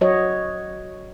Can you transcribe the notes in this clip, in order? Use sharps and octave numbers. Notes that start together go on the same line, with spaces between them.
F#3 F#4 C#5 D#5